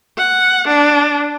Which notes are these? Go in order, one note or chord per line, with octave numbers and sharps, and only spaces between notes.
F#5
D4